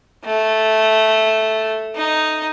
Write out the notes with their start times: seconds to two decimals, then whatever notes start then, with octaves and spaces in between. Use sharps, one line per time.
0.25 A3
1.95 D#4